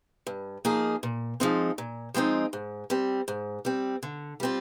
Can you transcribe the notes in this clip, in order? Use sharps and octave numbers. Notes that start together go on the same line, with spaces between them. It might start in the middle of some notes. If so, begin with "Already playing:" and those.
G2
F3 A#3 D#4 G#4
A#2
F3 G#3 C4 D#4
A#2
F3 G#3 C4 D#4
G#2
G3 C4
G#2
G3 C4
D3
G3 C4 F4